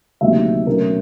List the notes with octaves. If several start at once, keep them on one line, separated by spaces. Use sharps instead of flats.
D2 C3 D#3 F#3 A#3 E5
B2 F#3 A3 C#4 A#4